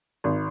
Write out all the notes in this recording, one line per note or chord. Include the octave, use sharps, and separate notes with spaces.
G#1